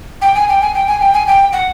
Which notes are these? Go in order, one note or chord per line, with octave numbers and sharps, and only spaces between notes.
G5
G#5
G5
G#5
G5
G#5
G5
G#5
G5
F#5